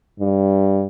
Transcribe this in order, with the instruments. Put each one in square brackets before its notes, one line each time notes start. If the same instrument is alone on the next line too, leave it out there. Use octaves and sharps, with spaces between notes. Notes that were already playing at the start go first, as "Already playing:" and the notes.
[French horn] G2